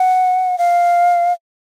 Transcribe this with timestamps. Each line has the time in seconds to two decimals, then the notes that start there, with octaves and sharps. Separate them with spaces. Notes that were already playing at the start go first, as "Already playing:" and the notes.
Already playing: F#5
0.58 F5